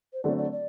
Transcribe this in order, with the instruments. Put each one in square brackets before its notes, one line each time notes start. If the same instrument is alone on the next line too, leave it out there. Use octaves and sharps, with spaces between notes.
[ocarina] C5
[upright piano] D3 F#3 A3 C4 [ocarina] D5
[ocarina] D5
D5